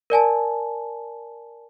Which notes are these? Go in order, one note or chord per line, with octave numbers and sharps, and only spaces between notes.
A#4 D5 G#5 A5